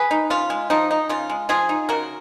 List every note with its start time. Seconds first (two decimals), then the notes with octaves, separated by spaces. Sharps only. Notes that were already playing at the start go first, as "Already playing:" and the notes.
Already playing: G#4 B4
0.11 D#4
0.30 C#3 F4
0.50 G#3
0.70 F3 D#4
0.91 D#4
1.09 C#3 F4
1.30 G#3
1.49 F3 F4 G#4
1.69 D#4
1.89 C#3 F#4 A#4